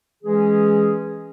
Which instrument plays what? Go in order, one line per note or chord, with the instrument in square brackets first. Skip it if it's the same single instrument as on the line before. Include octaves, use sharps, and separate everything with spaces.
[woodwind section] E3 G#3 C#4 G#4